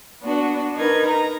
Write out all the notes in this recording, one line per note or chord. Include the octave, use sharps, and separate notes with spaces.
B3 D4 F#4
D#4 A#4 B4 G#6
A#5